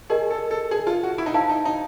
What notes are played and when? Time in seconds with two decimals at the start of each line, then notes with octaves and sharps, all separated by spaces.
0.10 G4 G#4 A#4 D#5 G#5
0.30 A4
0.51 A4
0.71 G#4
0.87 F4
1.03 F#4
1.18 E4
1.26 D#4
1.34 E4 C5 F5 A5
1.49 D#4
1.65 D#4